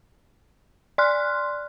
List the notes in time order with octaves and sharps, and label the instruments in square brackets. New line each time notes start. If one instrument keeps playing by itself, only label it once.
[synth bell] D5 C6 F6 F#6